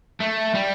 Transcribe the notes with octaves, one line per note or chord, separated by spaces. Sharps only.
A3
G3